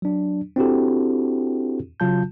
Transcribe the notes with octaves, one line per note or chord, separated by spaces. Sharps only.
F#3 D4
C4 D4 E4 F#4 G4 A4
C#3 F#3 F4 A5 G6